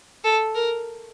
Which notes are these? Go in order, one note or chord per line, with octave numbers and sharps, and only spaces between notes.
A4
A#4